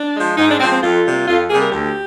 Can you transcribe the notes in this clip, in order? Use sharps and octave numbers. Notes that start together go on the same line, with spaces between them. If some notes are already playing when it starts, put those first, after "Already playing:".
Already playing: D4
F3 G#3
G#2 D#4
D4
F3 G#3 C4
C4
F2 F4
C3 G3 A#3
F2 F4
C3 G3 A#3 G#4
A#4
D2 G4